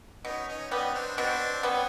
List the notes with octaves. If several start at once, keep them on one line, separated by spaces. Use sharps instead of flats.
B2 C#4 D#4
C#4 D#4
G3 B3 C#4 D#4
C4 D4
B2 C4 D4
G3 B3 C#4